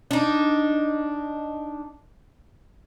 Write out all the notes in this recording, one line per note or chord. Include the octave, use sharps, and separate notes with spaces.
D4 D#4